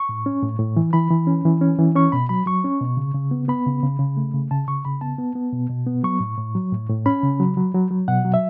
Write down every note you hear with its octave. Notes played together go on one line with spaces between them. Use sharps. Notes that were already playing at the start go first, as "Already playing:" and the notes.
Already playing: C#6
A2
C#4
A2
A2
E3
E3 B5
E3
C#4
E3
C#4
E3
C#4 C#6
B2 B5
F#3 B5
F#3 C#6
C#4
B2
C#3
C#3
B3
B3 B5
C#3
C#3
C#3
A3
C#3
C#3 A5
C#3 C#6
C#3 B5
B3 A5
B3
B3
B2
B2
B3
F#3 C#6
A2
A2
F#3
A2
A2
C#4 B5
C#3
F#3
F#3
F#3
F#3
B2 F#5
F#3
E5